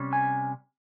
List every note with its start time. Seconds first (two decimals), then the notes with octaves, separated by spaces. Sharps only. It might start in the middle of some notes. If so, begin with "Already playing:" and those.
Already playing: C3 G3 C#4
0.13 G#5